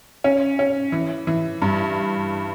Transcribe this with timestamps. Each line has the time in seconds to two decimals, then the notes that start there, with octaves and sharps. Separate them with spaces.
0.24 C#4
0.59 C#4
0.92 E3
1.27 E3
1.62 G2